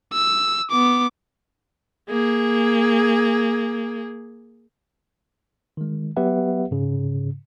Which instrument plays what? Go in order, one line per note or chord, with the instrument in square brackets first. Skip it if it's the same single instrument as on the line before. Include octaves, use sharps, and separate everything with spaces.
[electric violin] E6
B3 D6
[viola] A#3 G#4
[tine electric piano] D#3 G#3
F#3 B3 G4 B4 E5 F#5
G#2 C#3